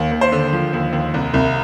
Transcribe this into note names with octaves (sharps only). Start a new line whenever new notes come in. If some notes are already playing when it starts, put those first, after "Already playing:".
Already playing: D#2
D#2
C5
D3
F3
D#2
D#2
C2
C2